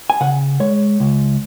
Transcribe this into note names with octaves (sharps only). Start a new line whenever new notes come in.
G#5
C#3 F#5
G#3 C#5
C#2